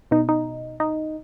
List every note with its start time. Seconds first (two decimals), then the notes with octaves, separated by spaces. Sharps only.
0.11 B2 D#4
0.29 D#4
0.80 D#4